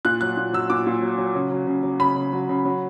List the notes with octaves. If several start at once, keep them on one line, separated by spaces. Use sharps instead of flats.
A#2 F#6
F#3 F#6
A#2
F#3 E6
A#2 D6
A#2
F#3
F#3
C#3
F#3
C#3
F#3
C#3 B5
C#3
F#3
C#3
F#3